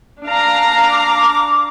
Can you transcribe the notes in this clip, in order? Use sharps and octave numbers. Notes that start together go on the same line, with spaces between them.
D4 F5 A#5
D6